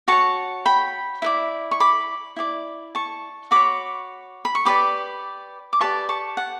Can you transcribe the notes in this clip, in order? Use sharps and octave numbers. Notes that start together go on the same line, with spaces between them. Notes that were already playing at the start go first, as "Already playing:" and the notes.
F#4 C#5 A5 C#6
G5 B5
E4 B4 D5
C#6
B5 D6
E4 G4 D5
A5 C#6
F#4 C#5 B5 D6
B5
C#6
G4 B4 D5 B5 D6
D6
G4 B4 D5 A5 C#6
A5 C#6
F#5 A5